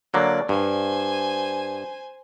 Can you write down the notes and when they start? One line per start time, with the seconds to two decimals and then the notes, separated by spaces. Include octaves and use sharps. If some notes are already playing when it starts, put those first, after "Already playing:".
0.14 D3 F#3 A#3 D5
0.49 G2 C5 G#5